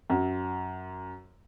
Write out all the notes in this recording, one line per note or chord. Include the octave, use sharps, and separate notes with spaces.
F#2